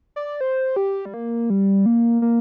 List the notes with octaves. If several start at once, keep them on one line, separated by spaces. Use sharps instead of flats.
D5
C5
G4
G3
A#3
G3
A#3
A#3